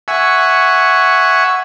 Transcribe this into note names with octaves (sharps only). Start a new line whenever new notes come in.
E5 F#5 G#5 C#6